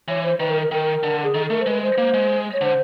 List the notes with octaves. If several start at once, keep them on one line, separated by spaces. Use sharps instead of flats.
E3 C#5
C5
D#3 B4
A#4
A#4
D#3 A#4
D3
G#4
D#3 A4
A4
A3 A#4
C5
G#3 B4
C5
A#3
G#3
C#5
D3 C5